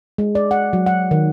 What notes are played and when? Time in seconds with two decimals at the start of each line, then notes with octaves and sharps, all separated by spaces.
0.18 G#3
0.35 D5
0.51 F#5
0.73 F#3
0.86 F#5
1.11 D#3